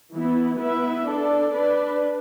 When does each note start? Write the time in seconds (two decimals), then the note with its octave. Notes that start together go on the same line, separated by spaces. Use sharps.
0.13 E3 B3 E4
0.59 B3 E4 B4 E5
1.06 D4 A4 D5
1.52 D4 B4 D5